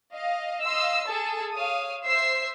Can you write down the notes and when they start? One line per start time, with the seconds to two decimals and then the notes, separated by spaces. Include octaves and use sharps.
0.14 D#5 F5
0.64 D#5 F5 C6 E6
1.06 G#4 A4 A5
1.53 C#5 F5 D#6
2.05 C5 E5 E6 C7